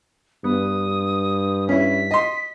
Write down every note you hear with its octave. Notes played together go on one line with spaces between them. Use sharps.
G2 B3 D#6
C#4 E4 B6
D#5 C6